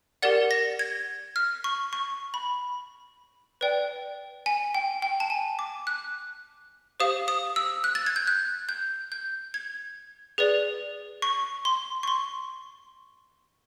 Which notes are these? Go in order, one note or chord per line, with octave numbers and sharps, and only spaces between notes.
G4 A#4 D5 F#5 A6
A#6
G#6
F6
C#6
C#6
B5
B4 D5 G5
G#5
G5
G5
A5
G#5
D6
F#6
G4 C5 F5 D#6
D#6
E6
F#6
A6
G#6
G6
F#6
G6
G6
G#6
G#4 B4 D5
C#6
C6
C#6
C6